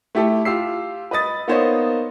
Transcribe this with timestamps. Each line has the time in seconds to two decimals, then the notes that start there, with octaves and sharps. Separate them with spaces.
0.15 A3 E4 G4 A4
0.45 F4 G4 E6 C7
1.11 B4 D#5 D#6 A6
1.48 A#3 B3 D#4 C5 C#5 D#5